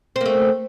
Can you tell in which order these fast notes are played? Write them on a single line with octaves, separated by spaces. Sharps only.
C4 A#3 A3